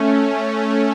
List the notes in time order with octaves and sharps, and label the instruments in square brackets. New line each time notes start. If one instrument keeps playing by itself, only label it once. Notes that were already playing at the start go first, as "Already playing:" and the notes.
Already playing: [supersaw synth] A3 C#4